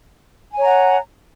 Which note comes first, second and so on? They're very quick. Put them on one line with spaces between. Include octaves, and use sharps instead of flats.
G#5 C#5 A#5 F#5